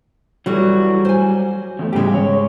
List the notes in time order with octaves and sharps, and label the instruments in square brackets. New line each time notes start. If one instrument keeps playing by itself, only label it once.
[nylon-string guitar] E3 F#4 A4 [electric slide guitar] F#3 G3
[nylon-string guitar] C5 G#5
[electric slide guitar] E2 A3
[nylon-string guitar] G#2 G#3 [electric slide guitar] C#3 G3 G4
[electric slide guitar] C#5